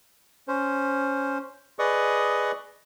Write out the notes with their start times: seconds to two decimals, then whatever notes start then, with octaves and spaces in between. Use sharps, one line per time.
0.48 C#4 C5
1.79 G#4 B4 D5 D#5 C#6 D#6